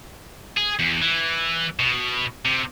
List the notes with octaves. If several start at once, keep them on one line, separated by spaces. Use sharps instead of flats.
G#4
E2
E3
B2
C3